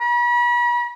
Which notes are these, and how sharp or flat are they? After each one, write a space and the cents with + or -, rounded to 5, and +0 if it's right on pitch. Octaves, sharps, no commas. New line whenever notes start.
B5 -40